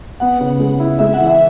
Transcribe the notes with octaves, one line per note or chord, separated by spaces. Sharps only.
B3 F#5
C#3
G#3
E4
G#3 E5
F#5
E3
E5